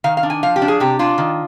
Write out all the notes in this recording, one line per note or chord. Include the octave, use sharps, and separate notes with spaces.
D#3 F5
F5
D4
G#5
F3 F5
G4
D4
G#4
C3 G4
D4 F4
D#3